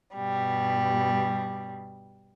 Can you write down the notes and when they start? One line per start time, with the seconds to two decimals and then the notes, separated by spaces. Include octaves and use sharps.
0.16 G2 B2 G3